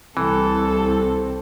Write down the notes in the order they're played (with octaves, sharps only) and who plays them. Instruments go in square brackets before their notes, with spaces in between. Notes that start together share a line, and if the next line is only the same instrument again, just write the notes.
[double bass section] C2 [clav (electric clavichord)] E3 [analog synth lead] C4 [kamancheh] A4